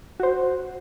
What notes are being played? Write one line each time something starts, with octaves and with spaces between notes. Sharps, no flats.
F#4 C5